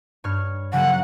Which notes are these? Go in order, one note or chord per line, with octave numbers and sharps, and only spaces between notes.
G2 C#5 F6
C#3 F#3 A#3 F#5